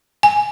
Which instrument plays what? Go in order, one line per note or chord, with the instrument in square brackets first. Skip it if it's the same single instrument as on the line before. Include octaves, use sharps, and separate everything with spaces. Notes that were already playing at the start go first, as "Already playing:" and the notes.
[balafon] G#5